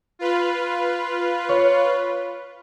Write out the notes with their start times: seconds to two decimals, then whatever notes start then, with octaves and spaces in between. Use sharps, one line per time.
0.19 F4 B4
1.49 C#5